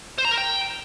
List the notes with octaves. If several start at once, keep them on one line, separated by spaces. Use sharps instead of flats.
C5
A#5
A#4
G5